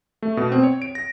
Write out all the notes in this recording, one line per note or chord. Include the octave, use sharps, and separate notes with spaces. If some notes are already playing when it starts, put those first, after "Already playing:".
A3
B2
C4
C#5
D7
A#6